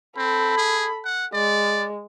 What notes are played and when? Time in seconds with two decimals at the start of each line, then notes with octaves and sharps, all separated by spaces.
0.18 C4 A4 B5
0.57 G#4
1.05 F#5
1.33 G#3 D5